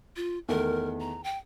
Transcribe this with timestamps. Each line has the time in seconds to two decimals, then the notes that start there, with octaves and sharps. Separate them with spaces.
0.16 F4
0.48 E2 D#3 A3 A#4
1.00 A#5
1.24 G5